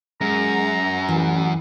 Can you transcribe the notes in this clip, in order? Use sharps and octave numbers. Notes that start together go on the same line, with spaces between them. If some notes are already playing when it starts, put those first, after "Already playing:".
F#2 G#3 A#5
A1 E3